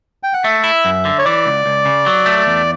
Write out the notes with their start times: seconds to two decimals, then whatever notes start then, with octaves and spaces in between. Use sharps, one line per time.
0.23 G5
0.34 F#5
0.44 A3 E5
0.64 E4
0.85 F#2
1.05 D3
1.18 C#5
1.25 E3 D5
1.46 C#2
1.66 C#2
1.85 C#3
2.06 F#3
2.26 A3
2.47 E2